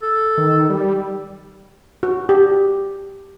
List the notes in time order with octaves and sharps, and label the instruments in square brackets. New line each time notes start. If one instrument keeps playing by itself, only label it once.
[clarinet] A4
[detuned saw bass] D#3
G3
[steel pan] F#4
G4